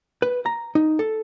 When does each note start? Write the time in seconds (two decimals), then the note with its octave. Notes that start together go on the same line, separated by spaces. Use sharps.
0.22 B4
0.46 A#5
0.75 D#4
0.99 A4